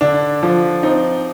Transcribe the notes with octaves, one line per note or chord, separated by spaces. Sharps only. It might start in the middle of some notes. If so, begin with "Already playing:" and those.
D3 D4
F3
C4 D#4